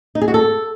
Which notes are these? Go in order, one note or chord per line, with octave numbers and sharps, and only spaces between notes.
D#4
G#4
F#4
A4